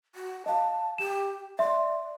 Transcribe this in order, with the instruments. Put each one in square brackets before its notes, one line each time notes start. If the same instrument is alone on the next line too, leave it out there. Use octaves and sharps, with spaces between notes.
[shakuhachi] F#4
[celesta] D#5 F5 [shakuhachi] A5
[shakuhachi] G4 [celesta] E7
[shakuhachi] D5 [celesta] E5 C6